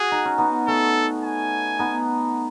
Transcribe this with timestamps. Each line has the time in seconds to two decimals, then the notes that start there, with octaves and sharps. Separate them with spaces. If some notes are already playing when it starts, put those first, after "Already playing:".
Already playing: F#4 G#4
0.12 D#4
0.25 C#4
0.38 B3 D#4
0.68 A3 C#4 A4
1.24 G#5
1.79 B3 D#4